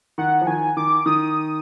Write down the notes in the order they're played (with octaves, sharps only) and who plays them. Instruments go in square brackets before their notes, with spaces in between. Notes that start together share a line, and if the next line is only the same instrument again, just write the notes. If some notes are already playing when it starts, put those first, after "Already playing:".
[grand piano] D#3 [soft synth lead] F#5
[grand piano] F3
[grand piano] D#3 [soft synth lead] G#5
[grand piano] D#3 [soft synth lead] D6
[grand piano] D#3 [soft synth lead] D#6